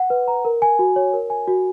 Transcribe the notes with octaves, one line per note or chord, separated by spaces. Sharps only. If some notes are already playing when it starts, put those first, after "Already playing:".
Already playing: F#5
B4
A#5
A#4
G#5
F#4
C#5
A#4
G#5
F#4